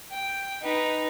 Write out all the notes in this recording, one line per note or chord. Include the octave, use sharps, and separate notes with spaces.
G5
D#4 B4